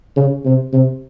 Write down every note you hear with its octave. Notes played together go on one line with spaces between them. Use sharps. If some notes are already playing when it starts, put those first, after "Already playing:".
C#3
C3
C3